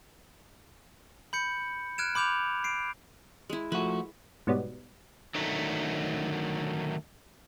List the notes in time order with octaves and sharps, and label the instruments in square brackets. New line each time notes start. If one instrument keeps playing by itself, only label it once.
[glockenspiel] B5 G6 C#7
F6 F#6 G#6 D7 E7
B5 D6 G6 F7
C7 D7
[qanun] G#3 E4
[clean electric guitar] F3 A3 F#4 [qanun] B4
[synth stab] G#2 B2 F#3 G3 B3
[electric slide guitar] D3 D#3 F#3 A3